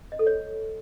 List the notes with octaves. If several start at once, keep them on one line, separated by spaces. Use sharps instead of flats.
D#5
A4
C#5